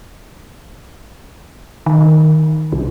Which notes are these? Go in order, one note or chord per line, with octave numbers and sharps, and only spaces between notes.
D#3
C2